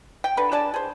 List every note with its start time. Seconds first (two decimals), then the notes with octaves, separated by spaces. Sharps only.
0.24 G5
0.37 D3 B4
0.52 D4 G#4 D5 A5
0.74 G#4 C5